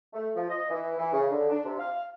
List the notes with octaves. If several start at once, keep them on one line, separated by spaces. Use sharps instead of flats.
A3
F3
D#5
E3
E3
C#3
D3
D4
C3
F5